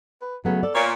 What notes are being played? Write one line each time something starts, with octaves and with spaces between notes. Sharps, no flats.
B4
C#3 F#3 A3 B3
A4 D5
A#2 C#5